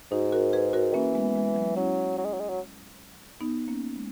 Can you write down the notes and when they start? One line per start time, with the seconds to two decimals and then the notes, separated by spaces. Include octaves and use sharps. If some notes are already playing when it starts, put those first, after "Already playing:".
0.11 G#2 D#4 F#4
0.32 F#4 A#4
0.53 G#4 B4
0.73 F#4 A#4
0.94 E3 A#3 C#4
1.15 G#3 B3
1.36 G#3
1.56 F#3
1.76 F#3 C#4 E4
2.18 F#3
2.25 G#3
2.34 F#3
2.41 G#3
2.49 F#3
3.41 B3 D#4
3.68 A#3 C#4
3.96 G#3